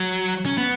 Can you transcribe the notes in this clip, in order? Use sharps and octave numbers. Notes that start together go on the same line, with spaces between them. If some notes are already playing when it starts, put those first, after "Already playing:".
Already playing: F#3
C#4
B3